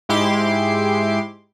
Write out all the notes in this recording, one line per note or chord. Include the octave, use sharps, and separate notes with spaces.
G#2 G#3 E4 G4 C6 D6